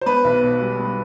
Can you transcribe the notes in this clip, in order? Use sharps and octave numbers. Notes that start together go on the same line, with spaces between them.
C5
B3 B4
B1
B2
G3
B3